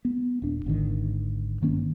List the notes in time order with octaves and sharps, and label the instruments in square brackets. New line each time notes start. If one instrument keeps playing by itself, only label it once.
[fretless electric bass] B3
D#1 D4
G#1 D3 D#3
G2 D#3 A#3 C#4